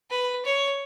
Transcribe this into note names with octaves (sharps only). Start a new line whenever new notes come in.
B4
C#5